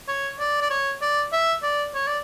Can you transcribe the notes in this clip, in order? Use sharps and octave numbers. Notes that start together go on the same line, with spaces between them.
C#5
D5
D5
C#5
D5
E5
D5
C#5
D5